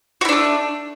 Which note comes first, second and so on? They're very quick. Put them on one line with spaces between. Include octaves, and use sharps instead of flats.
F#4 E4 D4 A3